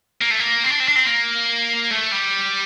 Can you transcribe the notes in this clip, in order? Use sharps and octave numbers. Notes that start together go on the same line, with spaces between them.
A#3
A3
A#3
C4
D4
C4
D4
C4
A#3
A3
G3